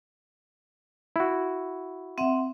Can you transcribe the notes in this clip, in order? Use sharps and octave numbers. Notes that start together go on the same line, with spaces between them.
E4 F#4
C4 E5 F#5